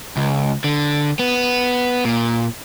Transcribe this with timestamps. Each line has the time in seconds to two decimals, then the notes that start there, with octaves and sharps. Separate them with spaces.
0.17 C#2
0.64 D3
1.19 B3
2.05 A#2